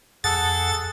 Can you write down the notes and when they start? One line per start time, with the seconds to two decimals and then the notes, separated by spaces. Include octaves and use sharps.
0.24 F2 G#4 A4 F#5 A6